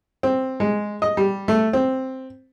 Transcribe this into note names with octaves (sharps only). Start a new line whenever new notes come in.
C4
G#3
D#5
G3
A3
C4